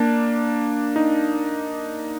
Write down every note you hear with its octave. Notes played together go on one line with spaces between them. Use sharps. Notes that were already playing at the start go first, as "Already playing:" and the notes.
Already playing: A#3 D4
D#4